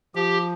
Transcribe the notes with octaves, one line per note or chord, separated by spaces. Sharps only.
F3 G4